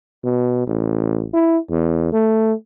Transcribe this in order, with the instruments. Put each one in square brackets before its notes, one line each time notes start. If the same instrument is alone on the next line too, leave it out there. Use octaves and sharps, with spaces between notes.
[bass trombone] B2
A1
E4
E2
A3